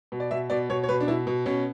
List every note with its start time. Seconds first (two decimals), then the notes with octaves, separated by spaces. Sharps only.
0.12 B2
0.20 D5
0.31 B2 E5
0.50 B2 D5
0.70 B2 C#5
0.83 C#5
0.88 B2 B4
1.00 D4
1.08 B2 E4
1.27 B2
1.46 B2 C#4